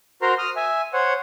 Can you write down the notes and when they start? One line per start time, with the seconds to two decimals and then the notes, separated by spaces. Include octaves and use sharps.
0.22 F#4 A#4 C5 A#5 C6
0.38 D#6 F6
0.56 E5 G#5
0.93 C5 C#5 F#5